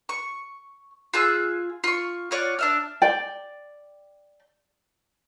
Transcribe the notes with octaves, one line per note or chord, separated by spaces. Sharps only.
C#6
F4 G#4 E6 F#6
F4 C#6
F4 C#5 D5 F#5
D4 E5 F6
D5 G5